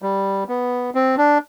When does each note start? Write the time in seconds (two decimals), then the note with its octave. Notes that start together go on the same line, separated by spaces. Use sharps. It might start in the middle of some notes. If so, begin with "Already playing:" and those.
0.02 G3
0.49 B3
0.95 C4
1.17 D4